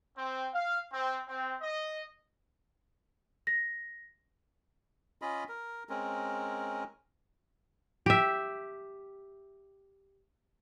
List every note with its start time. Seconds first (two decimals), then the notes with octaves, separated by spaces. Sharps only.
0.16 C4
0.53 F5
0.92 C4
1.28 C4
1.60 D#5
3.47 A#6
5.22 C#4 F4 D#5 B5
5.49 A#4
5.89 G#3 C4 C#4 A#4
8.06 G4 E5